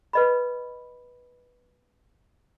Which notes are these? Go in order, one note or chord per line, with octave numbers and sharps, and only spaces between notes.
B4 D#5 B5